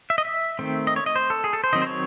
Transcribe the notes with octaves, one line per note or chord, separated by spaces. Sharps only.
E5
D#5
E5
D#3 A3 C4
D#5
C#5
D#5
C5
A4
G#4
A4
C5
D#3 F#3 C4 D#5
C5
C#5